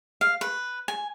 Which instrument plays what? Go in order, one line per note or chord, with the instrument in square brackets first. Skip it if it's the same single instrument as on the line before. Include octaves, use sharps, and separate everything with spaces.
[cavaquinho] F5
B4
G#5